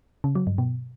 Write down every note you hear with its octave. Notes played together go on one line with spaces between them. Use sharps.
C#3
F#3
G2
B2